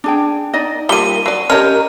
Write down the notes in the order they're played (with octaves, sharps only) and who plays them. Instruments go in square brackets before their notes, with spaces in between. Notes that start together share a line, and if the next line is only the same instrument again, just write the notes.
[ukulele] D4 G#4 G5
D#4 D5 D#5
[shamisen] G3 A#3 [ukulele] F4 [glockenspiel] D#7 G7
[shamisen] F#3 D5
[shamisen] C#4 A#4 [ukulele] G4 C#5 D#5 [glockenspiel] F6